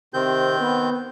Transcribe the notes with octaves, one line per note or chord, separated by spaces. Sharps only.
C3 D#3 C4 G6
B3